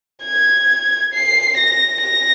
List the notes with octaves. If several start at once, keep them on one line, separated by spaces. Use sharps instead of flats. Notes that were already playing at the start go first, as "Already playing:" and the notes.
G#6
C7
A#6
A#6